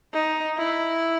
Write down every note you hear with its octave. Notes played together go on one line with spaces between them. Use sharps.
D#4
E4